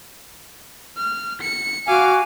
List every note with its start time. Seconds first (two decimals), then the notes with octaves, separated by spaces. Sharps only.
0.97 F6
1.41 C#7
1.88 F#4 F5 G#5 D6